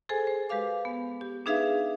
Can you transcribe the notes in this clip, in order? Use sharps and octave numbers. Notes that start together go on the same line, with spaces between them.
G#4 A4 C5 G#5
C5
G#3 G4 B4 F5 D6
B3
G4
D4 D#4 G#4 B4 E5 F5